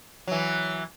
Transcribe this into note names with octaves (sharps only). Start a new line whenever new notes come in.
E3 F#3